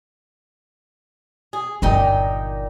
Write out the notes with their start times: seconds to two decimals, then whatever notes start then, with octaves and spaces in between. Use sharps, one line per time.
1.53 G#4
1.82 G1 A#2 D#4 G5